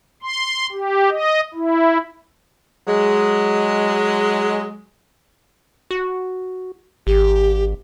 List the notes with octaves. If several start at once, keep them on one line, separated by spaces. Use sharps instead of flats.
C6
G4
D#5
E4
F#3 G#3
F#4
G#1 G4